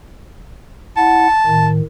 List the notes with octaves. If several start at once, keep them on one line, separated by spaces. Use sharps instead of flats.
E4 F#5 A5
A2 D#3